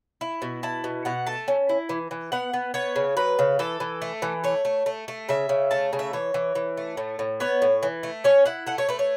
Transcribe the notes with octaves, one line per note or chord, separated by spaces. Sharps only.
E4
B2
E4 A5
B2
B2 F#5
A3 A5
C#4
E4
E3
E3
B3 F#5
B3
B3 C#5
C#3
F#3 B4
C#3
E3 A4
E3
A3
E3
A3 C#5
A3
A3
A3
C#3 E5
C#3
A3 A5
C#3
E5
E3 C#5
E3
E3
A3
A2
A2
B3 C#5
A2
E3
A3
C#4 C#5
E4 F#5
A3 F#5
C#5
A3 B4
C#5